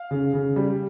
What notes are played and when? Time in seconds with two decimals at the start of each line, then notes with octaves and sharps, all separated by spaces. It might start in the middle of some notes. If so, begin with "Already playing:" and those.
Already playing: F5
0.11 C#3
0.33 C#3
0.56 G3